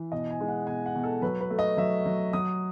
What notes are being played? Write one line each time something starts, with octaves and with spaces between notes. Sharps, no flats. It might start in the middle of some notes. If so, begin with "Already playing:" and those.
Already playing: E3
B2 D#5
G#5
G#3
F#5
B2 G#5
F#5
B2
A4
F#3 B4
B4
A3
D#5
F#3 E5
F#3
F#3 D#6